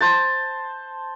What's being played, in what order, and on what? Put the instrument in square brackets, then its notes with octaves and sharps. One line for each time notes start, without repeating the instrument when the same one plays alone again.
[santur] C5 A5